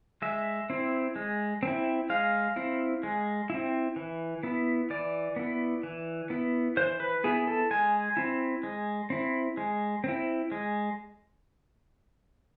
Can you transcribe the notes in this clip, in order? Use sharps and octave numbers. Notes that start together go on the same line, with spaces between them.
G#3 E5
C4 E4
G#3
C4 E4
G#3 F5
C4 E4
G#3
C4 E4
E3
B3 E4
E3 D5
B3 E4
E3
B3 E4
E3 C5
B4
B3 E4 G#4
A4
G#3 G#5
C4 E4
G#3
C4 E4
G#3
C4 E4
G#3